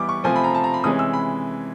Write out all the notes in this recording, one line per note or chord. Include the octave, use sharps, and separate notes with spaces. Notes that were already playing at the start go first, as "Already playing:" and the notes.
Already playing: E3 G3 B3 D6
C#6
C3 F3 A3 C4 G#5
B5
A#5
A5
A#5
B5
C3 E3 G#3 C#4 D#6
E6
B5